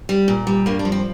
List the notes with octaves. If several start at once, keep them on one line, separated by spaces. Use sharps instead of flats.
G3
A#2
G3
G2 A#3
D4
F3
C4